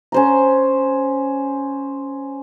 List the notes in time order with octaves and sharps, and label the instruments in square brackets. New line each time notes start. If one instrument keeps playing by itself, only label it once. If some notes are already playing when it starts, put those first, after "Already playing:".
[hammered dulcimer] C#4 C5 A#5